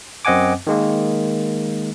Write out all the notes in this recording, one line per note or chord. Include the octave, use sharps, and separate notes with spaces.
F#2 C4 D#5 F#5 G#5 D6
D#3 G#3 A#3